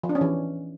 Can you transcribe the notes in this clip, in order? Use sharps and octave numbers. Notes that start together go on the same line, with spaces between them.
F3
D4
C#4
E3